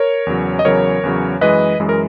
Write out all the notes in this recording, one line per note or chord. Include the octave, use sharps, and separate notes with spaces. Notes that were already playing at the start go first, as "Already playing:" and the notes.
Already playing: A#4 C#5
E2 C#3 F#3
D#5
E2 C#3 F#3 A#4 C#5
E2 C#3 F#3
F#2 E3 G#3 B4 D#5
F#2 E3 G#3
A#4